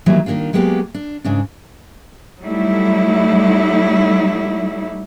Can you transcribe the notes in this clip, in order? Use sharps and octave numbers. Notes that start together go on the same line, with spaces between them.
D#3 E3 F#3 G3 A#3
D#3 F#3 A#3 D4 F4
F#3 G#3 A#3 B3 G4
D4
G#2 C#3 D4
F#3 G3 A3 D#4 E4